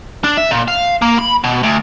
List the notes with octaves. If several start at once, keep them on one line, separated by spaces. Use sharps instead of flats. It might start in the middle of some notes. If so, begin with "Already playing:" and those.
D4
E5
A#2
F5
A#3
B5
B2
D2